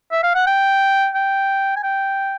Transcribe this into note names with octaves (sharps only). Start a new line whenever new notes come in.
E5
F5
F#5
G5
G5
G#5
G5